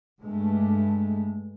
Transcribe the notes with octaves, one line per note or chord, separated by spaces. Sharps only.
G2 G#3 A3